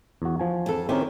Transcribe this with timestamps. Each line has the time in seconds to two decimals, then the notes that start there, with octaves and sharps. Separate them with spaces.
0.22 E2 F#4
0.39 F3 G#5
0.66 F2 A4
0.89 D#3 C4 C#4 E4 G4 A#4